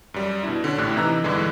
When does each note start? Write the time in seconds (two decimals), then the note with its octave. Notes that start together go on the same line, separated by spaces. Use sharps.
0.14 F#2 G3
0.43 B2 D4 E4
0.64 D3 C#4 D4
0.78 A#1 A2 D3 G4 F#6
0.96 C3 E3 D#4 A#5 E6 F#6
1.24 B1 G2 D3 E3 G#3